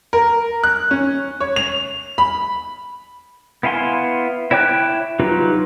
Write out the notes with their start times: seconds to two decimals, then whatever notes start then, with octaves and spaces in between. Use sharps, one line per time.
0.13 A#4
0.64 F#6
0.91 C#4
1.40 C#5
1.56 F7
2.18 B5
3.63 B3 E4 F5 G#5 C6
4.51 E4 C#5 G5 D6 F#6
5.20 F#3 D#4 F4 G4 B4